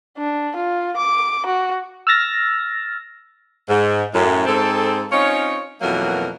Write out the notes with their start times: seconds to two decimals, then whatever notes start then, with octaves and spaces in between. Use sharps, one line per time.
0.18 D4
0.56 F4
0.97 D6
1.46 F#4
2.07 E6 F6 A6 A#6
3.69 G#2
4.14 F#2 A2
4.46 G#2 C4 A4
5.11 C4 C#4 D#4 F4 C#5
5.81 F2 B2 E3 F#3 A#3 A#4